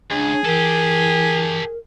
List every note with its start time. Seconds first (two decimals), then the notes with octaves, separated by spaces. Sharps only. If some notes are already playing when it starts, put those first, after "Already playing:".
0.11 C#2 D4 G#4
0.45 E3 G4 A4 A#4